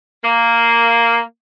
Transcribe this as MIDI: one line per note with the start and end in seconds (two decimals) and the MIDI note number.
0.24 1.21 58